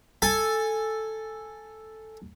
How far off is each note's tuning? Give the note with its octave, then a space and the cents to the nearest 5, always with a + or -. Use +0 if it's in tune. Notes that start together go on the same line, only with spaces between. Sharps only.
A4 +0 G#5 +0